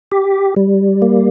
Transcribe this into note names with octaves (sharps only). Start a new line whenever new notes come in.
G4
G3
A#3